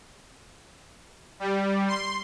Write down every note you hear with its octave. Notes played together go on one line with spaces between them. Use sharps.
G3
C6